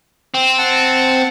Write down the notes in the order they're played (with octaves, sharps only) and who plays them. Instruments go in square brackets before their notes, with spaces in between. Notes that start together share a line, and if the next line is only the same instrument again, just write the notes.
[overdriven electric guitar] C4
[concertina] F#5 A5